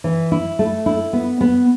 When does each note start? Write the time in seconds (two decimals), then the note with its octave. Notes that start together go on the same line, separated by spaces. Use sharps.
0.04 E3
0.32 E4
0.59 A3
0.86 E4
1.13 B3
1.41 B3